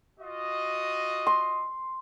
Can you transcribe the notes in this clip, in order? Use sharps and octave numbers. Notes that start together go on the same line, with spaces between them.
F4 F#4 D#5
C6